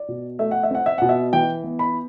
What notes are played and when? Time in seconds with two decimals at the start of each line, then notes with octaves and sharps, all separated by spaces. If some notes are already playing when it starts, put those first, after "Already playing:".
Already playing: D5
0.08 B2
0.39 A3 E5
0.51 F#5
0.63 E5
0.71 C4 F#5
0.86 E5
0.98 B2 F#5
1.09 E5
1.33 E3 G5
1.64 B3
1.79 B5